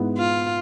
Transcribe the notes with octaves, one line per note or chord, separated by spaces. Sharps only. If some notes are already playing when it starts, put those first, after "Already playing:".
Already playing: G#2 G#3 B3 E4
F4